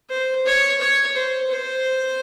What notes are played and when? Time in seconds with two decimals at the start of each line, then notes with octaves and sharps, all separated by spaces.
0.10 C5
0.46 C#5
0.80 C#5
1.15 C5
1.50 C5